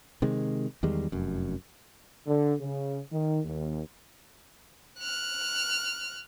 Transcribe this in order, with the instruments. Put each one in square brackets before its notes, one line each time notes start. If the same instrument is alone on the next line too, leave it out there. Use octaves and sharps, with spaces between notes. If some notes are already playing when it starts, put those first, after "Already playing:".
[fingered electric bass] C3 D#3 G#3
E2 D#3 G3 G#3
F1 F#2
[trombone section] D3
C#3
D#3
D#2
[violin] F6 F#6